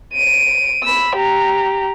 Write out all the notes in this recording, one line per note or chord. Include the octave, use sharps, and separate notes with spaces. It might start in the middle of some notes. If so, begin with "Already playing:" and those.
D7 D#7
B5 E6
G4 A#5